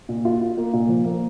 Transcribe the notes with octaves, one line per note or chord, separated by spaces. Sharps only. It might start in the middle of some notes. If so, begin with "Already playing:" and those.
A#2
F4
F4
A#3
A#2
F3
A#3